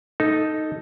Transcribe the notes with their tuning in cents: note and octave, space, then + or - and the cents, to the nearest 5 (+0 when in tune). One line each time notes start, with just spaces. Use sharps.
D#4 +0 A4 +0